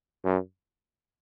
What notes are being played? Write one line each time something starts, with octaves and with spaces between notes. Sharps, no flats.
F#2